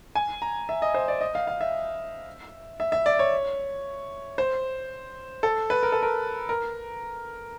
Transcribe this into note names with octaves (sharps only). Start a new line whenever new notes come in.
G#5
A#5
E5
D#5
C5
D5
D#5
F5
F5
E5
E5
E5
D5
C#5
C5
A4
B4
A#4
A4
A#4
A#4